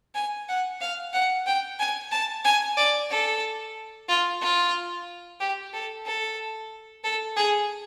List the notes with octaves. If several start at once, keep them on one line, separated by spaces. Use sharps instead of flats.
G#5
F#5
F5
F#5
G5
G#5
A5
G#5
D5
A4
F4
F4
G4
A4
A4
A4
G#4